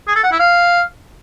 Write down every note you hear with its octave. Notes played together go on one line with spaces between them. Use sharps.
G#4
A4
F#5
E4
F5